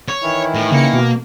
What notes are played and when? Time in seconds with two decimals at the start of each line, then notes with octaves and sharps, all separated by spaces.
0.08 C#5
0.23 D#3 E3 E4
0.55 A2
0.72 C#3 A#3 C#7
0.93 B2